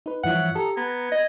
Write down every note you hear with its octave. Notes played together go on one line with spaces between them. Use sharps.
D#4 B4
G2 E3 F3 C#5 E5 F#5 E6
G4 A4 A#5 D#6
B3 A#5 G#6
D#5